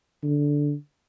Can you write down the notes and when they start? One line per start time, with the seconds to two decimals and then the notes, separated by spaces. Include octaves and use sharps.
0.23 D3